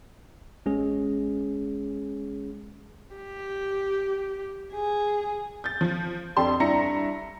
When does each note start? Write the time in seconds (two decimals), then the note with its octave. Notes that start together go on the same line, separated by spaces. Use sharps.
0.66 A1 G#3 C#4 G#4
3.16 G4
4.73 G#4
5.64 G6 A6
5.81 F3
6.37 F2 D4 G4 A5 C6
6.60 G2 D4 E4 A#5 A#6 C#7